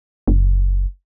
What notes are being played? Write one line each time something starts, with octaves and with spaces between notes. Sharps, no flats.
F#1